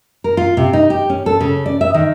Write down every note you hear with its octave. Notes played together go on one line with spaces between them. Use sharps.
A#4
F4
C3
D#4
G4
C#4
A4
C#3
D5
E5
D#3